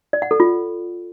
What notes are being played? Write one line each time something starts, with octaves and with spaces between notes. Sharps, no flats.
D5
F#5
A4
F4